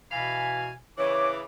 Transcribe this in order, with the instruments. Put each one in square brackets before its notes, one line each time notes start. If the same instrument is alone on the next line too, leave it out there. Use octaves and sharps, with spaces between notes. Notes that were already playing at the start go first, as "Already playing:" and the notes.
[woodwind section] B2 G#5 [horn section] E3 F5 B5
[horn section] C#3 E3 [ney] C#5 [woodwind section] D6